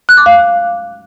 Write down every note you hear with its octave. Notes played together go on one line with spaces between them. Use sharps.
F#6
D6
F5